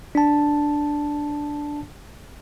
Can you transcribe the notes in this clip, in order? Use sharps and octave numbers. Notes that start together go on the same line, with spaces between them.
D4 A5